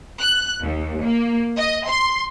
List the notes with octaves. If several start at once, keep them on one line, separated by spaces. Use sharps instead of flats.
F#6
D#2
A#3
D#5
C6